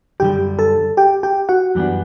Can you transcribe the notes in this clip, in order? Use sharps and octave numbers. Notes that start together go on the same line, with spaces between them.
F#2 D3 G3 G4 G5
A4 A5
G4 G5
G4 G5
F#4 F#5
F#2 E3 G3 B3 D4